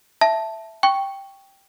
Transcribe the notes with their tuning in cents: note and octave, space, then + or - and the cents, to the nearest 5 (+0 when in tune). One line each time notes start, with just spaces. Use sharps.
E5 +0 A5 +0
G5 +0 C#6 +0